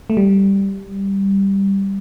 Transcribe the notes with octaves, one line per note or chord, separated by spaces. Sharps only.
A3
G3